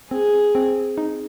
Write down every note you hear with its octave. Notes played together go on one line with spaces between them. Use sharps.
C4 G#4
C4
D#4